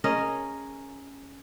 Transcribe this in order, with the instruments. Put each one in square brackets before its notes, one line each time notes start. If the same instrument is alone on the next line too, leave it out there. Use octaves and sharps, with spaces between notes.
[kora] C#4 G#4 A#4 D#5